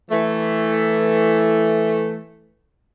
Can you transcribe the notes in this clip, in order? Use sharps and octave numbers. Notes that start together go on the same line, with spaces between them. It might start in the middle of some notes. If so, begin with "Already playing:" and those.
E3 A3